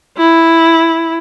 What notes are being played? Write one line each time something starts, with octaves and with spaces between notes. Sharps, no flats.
E4